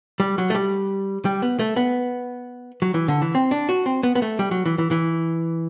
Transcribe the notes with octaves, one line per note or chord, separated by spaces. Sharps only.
G3
F#3
A3
G3
G3
B3
A3
B3
F#3
E3
D3
E3
C4
D4
F#4
C4
B3
B3
A3
G3
F#3
E3
E3
E3